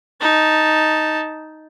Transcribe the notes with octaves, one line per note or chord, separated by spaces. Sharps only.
D#4 A5